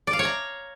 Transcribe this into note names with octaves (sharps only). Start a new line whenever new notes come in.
D5
F5
C#5
A#5